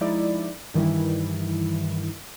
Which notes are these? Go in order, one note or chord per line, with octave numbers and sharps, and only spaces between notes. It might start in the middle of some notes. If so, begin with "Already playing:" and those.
F3 G#3 D#4 E4 D5
G2 D#3 E3 G3 E4